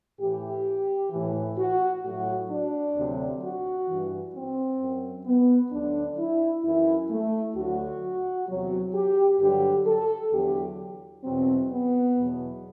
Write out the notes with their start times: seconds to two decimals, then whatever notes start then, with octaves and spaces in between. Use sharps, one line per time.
0.20 A2 E3 G4
1.11 A2 E3
1.58 F#4
2.04 A2 F#3 F#4
2.50 D4
2.96 D2 C3 F#3
3.42 F#4
3.88 G2 E3
4.35 C4
4.80 F#2 F#3
5.26 B3
5.72 D2 D3 F#3 D4
6.18 E4
6.64 F#2 E3 E4
7.11 A3
7.56 D2 D3 F#3 F#4
8.49 E2 C3 F#3
8.95 G4
9.40 G2 D3 F#3 G4
9.87 A4
10.32 E2 D3 F#3 G4
11.24 E2 B2 F#3 C4
11.71 B3
12.17 E2 B2 F#3